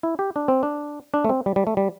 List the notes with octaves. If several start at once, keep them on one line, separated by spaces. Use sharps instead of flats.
E4
G4
D4
C4
D4
D4
A3
C4
G3
G3
A3
G3